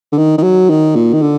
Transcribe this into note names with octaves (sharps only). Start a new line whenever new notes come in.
D3
D#3
D#3
F#3
D#3
A#2
D#3
D3